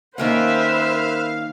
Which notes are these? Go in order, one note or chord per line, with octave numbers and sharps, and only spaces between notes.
D#3 A#3 C#4 B4 C5 E5 F5